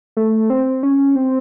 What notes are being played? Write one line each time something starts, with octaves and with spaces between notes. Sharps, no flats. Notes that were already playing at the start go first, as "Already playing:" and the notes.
A3
C4
C#4
C4